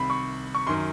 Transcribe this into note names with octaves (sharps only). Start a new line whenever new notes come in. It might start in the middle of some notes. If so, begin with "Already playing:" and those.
Already playing: C2 C3 D#3 B5
C#6
C#6
F#2 D#3 C6